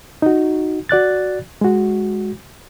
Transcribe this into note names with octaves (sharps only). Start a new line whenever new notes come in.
D#4 F#4
F#4 D5 F#6 A6
G#3 F#4